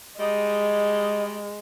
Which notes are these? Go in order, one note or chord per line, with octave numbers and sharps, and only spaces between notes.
G3 G#3 D#4 D#5